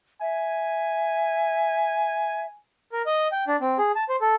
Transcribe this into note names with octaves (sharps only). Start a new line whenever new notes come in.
E5 G#5
A#4
D#5
G5
D4
C4
G#4
A5
C5
A4